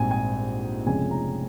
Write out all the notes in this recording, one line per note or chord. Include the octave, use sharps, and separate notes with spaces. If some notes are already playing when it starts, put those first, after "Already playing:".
Already playing: A#1 G#2 G3 C4 G#5
G#5
F1 F2 C#3 G#3 C#4 G#5
A#5